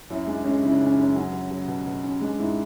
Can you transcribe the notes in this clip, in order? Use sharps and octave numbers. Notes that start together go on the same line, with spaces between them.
F#2 E4
G#3 D4
G#3 C#4
C#3 E4
D4
C#3
C#4
F#2 D4
F#3 C#4
F#3
F#3
B2
B2
C#4
G#3 D4
G#2 E4